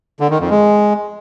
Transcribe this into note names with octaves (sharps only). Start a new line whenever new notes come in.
D3
D#3
F2
G#3